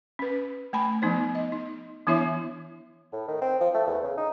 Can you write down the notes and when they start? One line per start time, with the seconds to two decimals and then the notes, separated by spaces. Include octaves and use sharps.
0.19 C#4 B4
0.73 A3 G#5 B5
1.02 F3 B3 D#4 C5
1.35 D#5
1.52 D#4
2.07 E3 B3 D4 E4 C#5 E5
3.12 A2
3.28 D#3
3.41 C4
3.60 F3
3.75 A3
3.86 E2
4.04 C#3
4.17 D#4